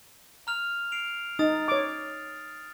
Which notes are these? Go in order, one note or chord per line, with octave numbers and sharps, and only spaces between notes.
A#5 F6 F7
C7 D7 F7
D#4 D#6 A6
C#5 D6